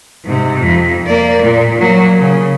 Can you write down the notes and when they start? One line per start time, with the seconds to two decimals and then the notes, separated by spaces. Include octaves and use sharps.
0.25 G#2 C3
0.60 F2
1.06 A#3 D5
1.43 A#2
1.78 F#3 A#3
2.18 C#3